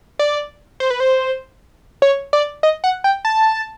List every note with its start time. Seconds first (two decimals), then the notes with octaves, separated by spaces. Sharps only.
0.19 D5
0.80 C5
0.90 B4
1.00 C5
2.02 C#5
2.33 D5
2.63 D#5
2.84 F#5
3.04 G5
3.25 A5